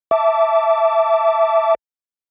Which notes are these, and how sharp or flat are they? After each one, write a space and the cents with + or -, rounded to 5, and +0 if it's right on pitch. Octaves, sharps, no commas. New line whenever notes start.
E5 +0 A5 +0 D6 -20